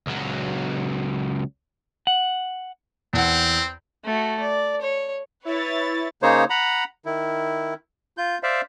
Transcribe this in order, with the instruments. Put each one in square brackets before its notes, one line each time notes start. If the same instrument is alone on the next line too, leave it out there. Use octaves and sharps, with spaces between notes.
[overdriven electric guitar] C#2 F#3
[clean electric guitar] F#5
[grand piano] E2 F#5 [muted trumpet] C4
[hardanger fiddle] A3 F#4
D5
C#5
[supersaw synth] E4 [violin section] B4 C#5 A6
[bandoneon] C#3 A#3 D#4 C5 C#5
F#5 A#5 B5
D#3 E4
F4 G6
C5 D5 E5 F5